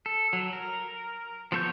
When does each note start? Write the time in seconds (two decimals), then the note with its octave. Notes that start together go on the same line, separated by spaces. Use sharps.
0.06 A4
0.33 F#3
0.53 A#4
1.52 F3 B3 A4 C#5 G6